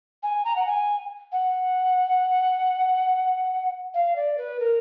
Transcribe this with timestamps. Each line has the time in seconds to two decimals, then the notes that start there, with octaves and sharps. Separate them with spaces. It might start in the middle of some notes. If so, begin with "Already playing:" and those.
0.23 G#5
0.44 A#5
0.56 F#5
0.66 G#5
1.32 F#5
3.94 F5
4.15 D5
4.37 B4
4.59 A#4